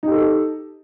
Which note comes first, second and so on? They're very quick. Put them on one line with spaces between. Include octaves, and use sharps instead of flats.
D#4 G4 A4